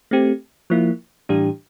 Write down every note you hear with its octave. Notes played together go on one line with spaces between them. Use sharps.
A3 C4 G4
F3 A#3 E4
A2 E3 G3 D4 G4